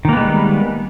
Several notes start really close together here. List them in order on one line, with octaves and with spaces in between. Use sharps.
D#3 A#3 B3 G#3 G3